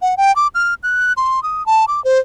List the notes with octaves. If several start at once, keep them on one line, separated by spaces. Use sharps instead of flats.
F#5
G5
D6
F6
F#6
C6
D#6
A5
D6
C5